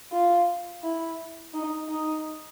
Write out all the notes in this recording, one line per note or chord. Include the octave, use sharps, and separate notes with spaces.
F4
E4
D#4
D#4